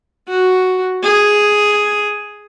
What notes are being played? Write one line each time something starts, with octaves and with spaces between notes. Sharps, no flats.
F#4
G#4